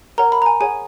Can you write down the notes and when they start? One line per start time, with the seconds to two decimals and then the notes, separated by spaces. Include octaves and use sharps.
0.18 A#4 C#5 F#5 A#5
0.32 B5
0.42 A#5
0.46 G#5
0.61 G#4 C#5 F#5 G#5